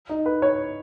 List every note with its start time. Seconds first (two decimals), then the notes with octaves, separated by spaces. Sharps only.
0.09 D#4
0.26 B4
0.42 C#5